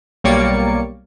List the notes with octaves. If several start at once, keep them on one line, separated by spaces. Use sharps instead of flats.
B1 G3 A#3 C#5 D5 C#7